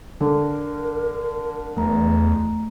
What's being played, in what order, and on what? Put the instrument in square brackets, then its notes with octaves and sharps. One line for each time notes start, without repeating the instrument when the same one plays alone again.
[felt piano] D3 [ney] A#4
[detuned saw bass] E2 [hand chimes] A3 A#5